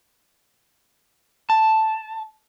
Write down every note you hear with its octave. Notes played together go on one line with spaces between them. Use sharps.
A5